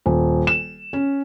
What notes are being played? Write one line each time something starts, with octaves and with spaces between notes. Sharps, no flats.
D#1
E7
C#4